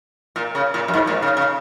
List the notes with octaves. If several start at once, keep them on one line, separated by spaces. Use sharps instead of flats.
A#2
C#3
A#2
F#2
G#2
A#2
C#3
C#3